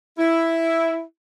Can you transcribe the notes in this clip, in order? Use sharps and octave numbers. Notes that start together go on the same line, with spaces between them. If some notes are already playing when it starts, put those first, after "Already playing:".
E4